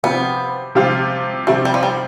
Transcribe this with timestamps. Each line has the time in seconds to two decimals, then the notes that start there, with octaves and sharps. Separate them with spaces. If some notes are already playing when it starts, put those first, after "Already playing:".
0.03 C3 F3 B3 C4 F4
0.75 C3 F3 C4 F4
1.47 C3 F3 A3 C4 F4
1.65 G3
1.74 F3
1.83 G3